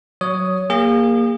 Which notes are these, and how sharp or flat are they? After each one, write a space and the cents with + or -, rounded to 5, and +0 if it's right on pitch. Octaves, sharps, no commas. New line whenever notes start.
F#3 +0 C#5 +15 D#6 +0
A#3 +0 G#4 -40